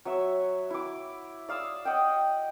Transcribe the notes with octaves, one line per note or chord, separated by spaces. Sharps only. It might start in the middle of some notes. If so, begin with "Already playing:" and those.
F#3 C#5 E5
E4 D6
D5 F5 D#6 E6
D#5 F#5 G5